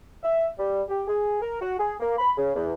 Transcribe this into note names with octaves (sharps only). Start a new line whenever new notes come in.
E5
G3
G4
G#4
A#4
F#4
G#4
A#3
B5
C#3
E2